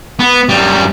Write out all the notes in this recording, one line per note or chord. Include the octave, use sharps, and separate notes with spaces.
B3
F#2 G3